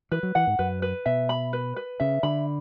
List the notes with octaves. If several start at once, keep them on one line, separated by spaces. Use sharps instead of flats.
E3 B4
F#3
E3 F#5
G#2
F#2 B4
B4
B2 E5
B5
B4
B4
C#3 E5
D3 B5